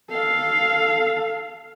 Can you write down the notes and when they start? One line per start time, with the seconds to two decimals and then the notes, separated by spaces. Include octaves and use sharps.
0.10 A4 F5